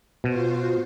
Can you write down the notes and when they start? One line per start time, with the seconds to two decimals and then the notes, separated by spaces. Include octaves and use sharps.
0.24 B2 F4 F#4 C5